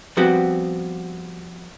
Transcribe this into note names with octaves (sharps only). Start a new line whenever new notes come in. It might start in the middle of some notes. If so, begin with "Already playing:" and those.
F3 G3 B3 C4 F#4 G4